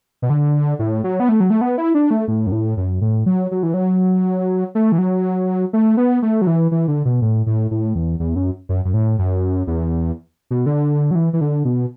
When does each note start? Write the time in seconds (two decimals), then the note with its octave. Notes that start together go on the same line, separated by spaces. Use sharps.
0.22 B2
0.30 D3
0.79 A2
1.04 F#3
1.20 B3
1.29 A3
1.40 F#3
1.50 A3
1.61 B3
1.78 E4
1.95 D4
2.11 A3
2.28 A2
2.47 F#2
2.52 A2
2.77 F#2
3.01 A2
3.26 F#3
3.51 F#3
3.63 E3
3.74 F#3
4.75 A3
4.92 E3
4.98 F#3
5.73 A3
5.97 B3
6.22 A3
6.42 F#3
6.47 E3
6.72 E3
6.88 D3
7.05 B2
7.22 A2
7.46 A2
7.71 A2
7.95 E2
8.20 E2
8.36 F#2
8.69 F#2
8.85 F#2
8.94 A2
9.19 F#2
9.67 E2
10.51 B2
10.66 D3
11.11 F#3
11.15 E3
11.33 E3
11.41 D3
11.65 B2